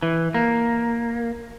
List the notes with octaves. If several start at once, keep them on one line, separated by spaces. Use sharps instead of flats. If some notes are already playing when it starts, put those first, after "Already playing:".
E3
A#3